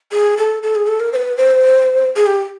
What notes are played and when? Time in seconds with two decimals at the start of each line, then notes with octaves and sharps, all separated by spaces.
0.12 G#4
0.37 A4
0.63 A4
0.75 G#4
0.87 A4
1.00 A#4
1.13 C5
1.16 B4
1.37 C5
2.16 G#4
2.26 G4